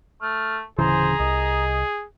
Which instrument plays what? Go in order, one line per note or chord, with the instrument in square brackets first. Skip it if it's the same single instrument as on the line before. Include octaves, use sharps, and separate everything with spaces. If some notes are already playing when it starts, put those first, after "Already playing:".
[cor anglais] A3 [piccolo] F6
[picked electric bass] D1 C#3 E3 [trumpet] G#4 [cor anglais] C5 [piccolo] A#5
[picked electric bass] C2 [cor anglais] D#5